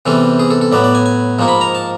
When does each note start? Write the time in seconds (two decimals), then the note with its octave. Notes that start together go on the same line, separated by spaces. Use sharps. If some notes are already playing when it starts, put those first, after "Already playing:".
0.06 E2 C3 E3 G3 C4 A4
0.39 G#4
0.50 A4
0.61 A4
0.72 A2 F#3 B3 D5
0.84 D5
0.95 G#5
1.06 G#5
1.39 G#2 F3 A#3 D#4
1.48 B5
1.61 A#5
1.75 A5